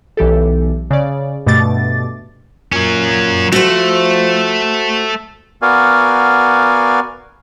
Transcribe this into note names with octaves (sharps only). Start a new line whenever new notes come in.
B1 E3 G4 A4
C#3 D5
G2 B2 A3 D6 A6
A#2 F#3 C#4
F3 A3 F#4 C5
B3 F#4 A#4 D5 F5 G#5